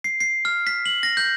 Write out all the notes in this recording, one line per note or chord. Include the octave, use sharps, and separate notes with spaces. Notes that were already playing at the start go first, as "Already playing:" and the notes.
C7
C7
F6
B6
F#7
A#6
G6